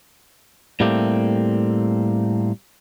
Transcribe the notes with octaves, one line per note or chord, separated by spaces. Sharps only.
A2 G3 A3 A#3 C4 G4